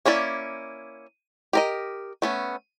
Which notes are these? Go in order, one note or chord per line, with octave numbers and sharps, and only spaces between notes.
A#3 C#4 E4 D5
G4 A#4 D#5
A3 B3 C#4